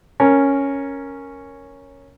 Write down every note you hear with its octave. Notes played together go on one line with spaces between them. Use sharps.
C#4 A#4